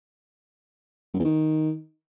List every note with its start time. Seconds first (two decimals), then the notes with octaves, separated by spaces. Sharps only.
1.14 F#2
1.19 E2
1.24 D#3